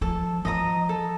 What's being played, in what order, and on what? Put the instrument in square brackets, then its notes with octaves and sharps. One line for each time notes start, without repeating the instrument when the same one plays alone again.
[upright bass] F3 [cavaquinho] A4
[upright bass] F3 [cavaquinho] D#5 A#5 D#6
[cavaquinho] A4